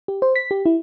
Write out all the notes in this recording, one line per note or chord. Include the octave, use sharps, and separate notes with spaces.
G4
C5
B6
G4
E4